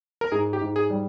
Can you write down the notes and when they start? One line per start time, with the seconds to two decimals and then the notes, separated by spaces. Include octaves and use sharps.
0.21 A#4
0.32 G#2 G#4
0.53 G4
0.61 G#2
0.76 G#4
0.90 G3